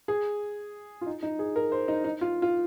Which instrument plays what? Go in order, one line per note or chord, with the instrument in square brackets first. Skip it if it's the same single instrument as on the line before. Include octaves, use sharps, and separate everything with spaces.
[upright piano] G#4
F4
D#4
D#4
G#4
A#4
C5
D#4
D#4
F4
F4